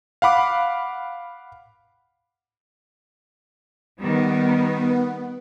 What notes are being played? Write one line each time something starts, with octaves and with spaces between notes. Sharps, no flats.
F5 F#5 B5 D6
D#3 G3 B3